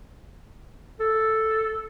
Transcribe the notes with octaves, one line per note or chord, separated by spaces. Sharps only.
A4